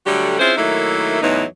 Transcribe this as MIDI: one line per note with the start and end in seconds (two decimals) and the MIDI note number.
0.06 0.35 50
0.06 0.35 54
0.06 0.35 55
0.06 0.35 57
0.06 0.35 66
0.06 0.35 67
0.40 0.52 60
0.40 0.52 61
0.40 0.52 64
0.40 0.52 65
0.40 0.52 68
0.40 0.52 72
0.57 1.22 51
0.57 1.22 54
0.57 1.22 57
0.57 1.22 58
0.57 1.22 63
0.57 1.22 64
1.22 1.44 40
1.22 1.44 45
1.22 1.44 52
1.22 1.44 54
1.22 1.44 59
1.22 1.44 63